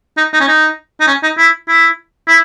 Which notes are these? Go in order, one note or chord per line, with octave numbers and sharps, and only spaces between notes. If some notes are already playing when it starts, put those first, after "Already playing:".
D#4
D#4
C#4
D#4
D#4
C#4
D#4
E4
E4
E4